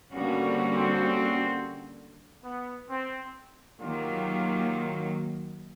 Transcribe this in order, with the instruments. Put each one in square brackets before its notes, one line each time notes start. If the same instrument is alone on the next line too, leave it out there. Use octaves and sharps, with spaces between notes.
[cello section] D3 G3 A#3 C#4 F#4 [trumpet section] B3
[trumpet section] C4
C4
B3
C4
[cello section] D#3 F#3 A#3 [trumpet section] F4 G4